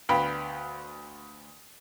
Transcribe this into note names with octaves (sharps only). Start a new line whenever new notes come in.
D2 B3 F5 G5 B5